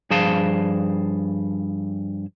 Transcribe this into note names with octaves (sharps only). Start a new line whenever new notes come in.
G2 F3 G#4 F5 A5